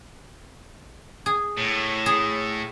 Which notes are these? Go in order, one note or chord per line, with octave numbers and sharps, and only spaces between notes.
G#4
A2
G#4